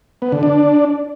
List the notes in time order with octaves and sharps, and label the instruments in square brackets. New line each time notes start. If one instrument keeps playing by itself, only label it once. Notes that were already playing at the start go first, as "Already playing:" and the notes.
[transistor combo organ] B3
D3
D4